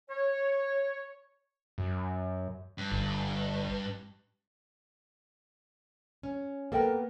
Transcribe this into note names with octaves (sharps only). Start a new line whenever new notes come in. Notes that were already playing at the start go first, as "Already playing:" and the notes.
C#5
F#2
G2
G1
C#4
A#3 B3 A4 A#4 G5